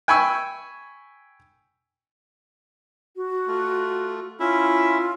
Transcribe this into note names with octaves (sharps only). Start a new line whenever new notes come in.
G5 G#5 B5 C#6 E6
F#4
A3 F4
C#4 E4 F4 E5